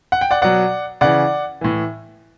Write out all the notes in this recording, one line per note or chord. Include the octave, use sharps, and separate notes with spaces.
F#5
G5
D5 F#5
B2 F#3 D5 F#5
C#3 E3 D5 F#5
A2 E3